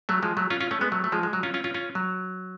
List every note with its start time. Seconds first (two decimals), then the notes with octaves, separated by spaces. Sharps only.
0.09 F#3 A3
0.23 F3 G#3
0.37 F#3 A3
0.50 C#4 F4
0.60 C#4 F4
0.71 A3 C#4
0.81 G#3 B3
0.92 F#3 A3
1.04 A3
1.12 F3 G#3
1.23 G#3
1.33 F#3
1.43 C#4 F4
1.54 C#4 F4
1.64 C#4 F4
1.74 C#4 F4
1.95 F#3